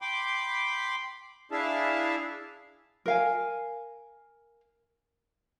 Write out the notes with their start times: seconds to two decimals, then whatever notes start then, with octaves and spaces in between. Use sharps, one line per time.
0.02 G5 B5 C6 D6
1.52 D4 E4 G#4 E5 F5 A5
3.06 A#4 F5 G#5